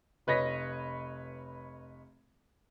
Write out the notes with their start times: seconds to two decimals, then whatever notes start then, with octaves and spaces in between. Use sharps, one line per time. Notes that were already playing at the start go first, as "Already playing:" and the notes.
0.27 F1 B4 C#5 D#5 A#6 B6